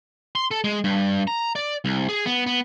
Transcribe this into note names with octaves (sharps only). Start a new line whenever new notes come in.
C6
A4
G#3
G2
A#5
D5
C2
G#4
B3
B3